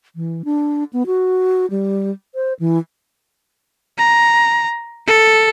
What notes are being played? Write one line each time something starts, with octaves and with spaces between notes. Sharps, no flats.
E3
D4
B3
F#4
G3
C5
E3
A#5
A4